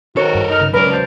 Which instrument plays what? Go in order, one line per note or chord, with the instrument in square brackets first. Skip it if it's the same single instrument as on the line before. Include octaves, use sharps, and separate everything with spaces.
[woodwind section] G#2 D#3 F#4 [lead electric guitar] A4 A#4 [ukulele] C#5
[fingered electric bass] G2
[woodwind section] D#4 D#5 F6
[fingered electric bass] C#3
[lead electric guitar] C#2 D5 [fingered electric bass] C#3 F#3 [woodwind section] C#4 A#4 [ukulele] B4
[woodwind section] F#2 C5 A5